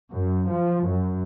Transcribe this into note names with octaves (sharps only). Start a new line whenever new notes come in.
F#2
F3
F#2